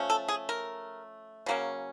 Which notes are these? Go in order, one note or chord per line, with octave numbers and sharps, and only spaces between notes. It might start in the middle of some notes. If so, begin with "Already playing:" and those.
Already playing: F3 A3 C#4
A4
G#4
A#4
C#3 F#3 A#3 C#4